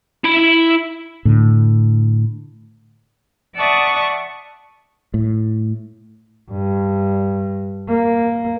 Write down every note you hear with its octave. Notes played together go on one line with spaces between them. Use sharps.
E4 B5
A2 D3
D5 E5 F#5 A5 C#6 D#6
A2
G2
A#3